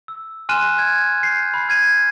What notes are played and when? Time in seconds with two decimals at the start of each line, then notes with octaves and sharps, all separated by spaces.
0.08 E6
0.49 G#5 C6 F6 F#6 D#7 E7
0.78 G#6
1.22 G6 C7
1.54 B5 C7
1.69 F6 G#6 D#7